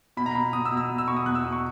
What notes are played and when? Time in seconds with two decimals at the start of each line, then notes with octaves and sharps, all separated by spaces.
0.17 B2 B5
0.26 A#5
0.35 B2 B5
0.53 B2 D#6
0.65 E6
0.71 B2
0.77 E6
0.89 B2
0.98 E6
1.07 B2 C#6
1.17 D#6
1.26 E2 F#6
1.35 E6
1.44 B2 D#6
1.52 C#6